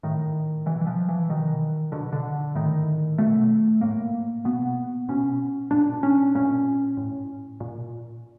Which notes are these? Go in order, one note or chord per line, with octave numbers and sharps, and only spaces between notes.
A2 D#3
B2 E3
E3
F3
E3
B2 D#3
B2 D3
D3
A2 D#3
B2 A3
A2 A#3
B2 B3
B2 C#4
A#2 D4
C#4
A#2 C#4
A2
A#2